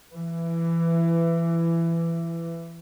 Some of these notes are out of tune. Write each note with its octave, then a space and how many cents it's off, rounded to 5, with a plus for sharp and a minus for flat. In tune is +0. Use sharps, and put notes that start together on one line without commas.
E3 +20